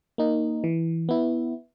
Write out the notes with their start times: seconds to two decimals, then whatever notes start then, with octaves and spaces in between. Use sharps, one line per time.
0.18 A#3 D#4
0.64 E3
1.09 B3 E4